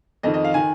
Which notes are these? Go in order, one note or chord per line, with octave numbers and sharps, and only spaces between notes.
F2 D#3 D#5
D#5
F5
D#3 G#5